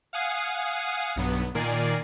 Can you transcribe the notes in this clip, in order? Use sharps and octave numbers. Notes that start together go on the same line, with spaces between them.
F5 F#5 G#5 D#6 C7
B1 G2 F#3 B3
A#2 D#3 A#4 D5 G#5 C7